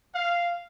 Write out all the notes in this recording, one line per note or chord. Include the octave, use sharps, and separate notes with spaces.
F5